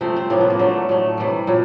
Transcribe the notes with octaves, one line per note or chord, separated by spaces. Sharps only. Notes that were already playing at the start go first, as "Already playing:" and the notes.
C3 F3 A3 C4
C4
A2 F3 A#3 B3
B3
A#3
D3 F#3 A3
A2 F#3 A3
C3 E3 G3
A#2 F#3